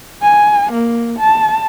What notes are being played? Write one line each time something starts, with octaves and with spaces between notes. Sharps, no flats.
G#5
A#3
A5